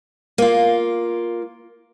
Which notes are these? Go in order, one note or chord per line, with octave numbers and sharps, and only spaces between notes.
A#3 F4